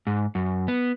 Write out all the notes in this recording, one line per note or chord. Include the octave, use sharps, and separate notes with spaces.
G#2
F#2
B3